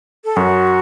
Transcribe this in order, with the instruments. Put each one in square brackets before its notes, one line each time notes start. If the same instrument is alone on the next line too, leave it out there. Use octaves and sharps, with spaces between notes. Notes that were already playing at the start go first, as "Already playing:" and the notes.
[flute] A4
[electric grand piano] F#2 [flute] F#4